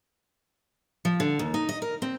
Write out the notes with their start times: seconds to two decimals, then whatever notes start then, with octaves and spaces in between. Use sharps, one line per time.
1.05 F3
1.20 D3
1.39 D#2
1.54 D#4
1.69 D#5
1.82 A#4
2.02 C4